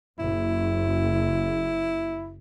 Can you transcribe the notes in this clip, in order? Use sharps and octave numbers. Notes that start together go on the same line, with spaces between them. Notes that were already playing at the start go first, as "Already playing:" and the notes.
F#1 E4